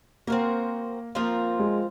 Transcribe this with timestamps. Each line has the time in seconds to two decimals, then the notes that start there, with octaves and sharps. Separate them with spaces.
0.27 A#3 C4 F#4 A#4
1.15 F3 A#3 C4 F4 A#4
1.60 G#3